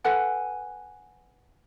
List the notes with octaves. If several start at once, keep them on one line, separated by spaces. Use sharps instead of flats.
A4 B4 F#5 G#5